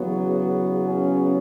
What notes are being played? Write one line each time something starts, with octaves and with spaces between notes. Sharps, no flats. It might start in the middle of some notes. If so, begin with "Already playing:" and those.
Already playing: E2 C#3 F#3 B3
C#4